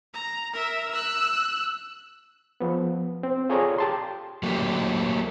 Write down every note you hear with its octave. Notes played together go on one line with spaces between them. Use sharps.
A#5
A#4 E5
E6 F#6
F3 B3
C4
F4 G#4 A4 C#5 D5 A#5
G4 A5 C6
F#3 A3 A#3 F#4 G4